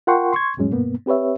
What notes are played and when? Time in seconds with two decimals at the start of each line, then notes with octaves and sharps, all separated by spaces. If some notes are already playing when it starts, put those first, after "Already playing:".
0.07 F4 A#4 F#5 G5 C6 C#6
0.33 C6 C#6 G#6
0.57 F2 A2 F#3 G#3 C#4
0.71 G2 B2 A#3 B3
1.06 C4 G4 B4 C#5 E5